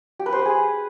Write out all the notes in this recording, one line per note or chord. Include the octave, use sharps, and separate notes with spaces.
G4
B4
C5
B4
G#4